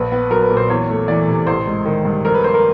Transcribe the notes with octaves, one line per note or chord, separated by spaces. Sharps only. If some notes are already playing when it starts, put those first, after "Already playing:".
Already playing: A#1 B4
B3
F#3 A#4
B4
A#2
C5
E2 C#5
A3
E3 D5
C3
A1 C5
G#3
D#3
G2
F2 A#4
B4
A#3 C5
A#4